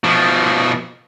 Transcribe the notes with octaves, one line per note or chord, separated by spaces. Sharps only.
B2 F3